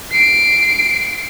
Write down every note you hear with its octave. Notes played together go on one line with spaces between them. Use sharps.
C7 D7